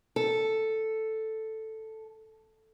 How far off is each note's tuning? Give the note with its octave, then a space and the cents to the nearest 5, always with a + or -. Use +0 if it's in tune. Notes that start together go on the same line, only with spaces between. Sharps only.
A4 +0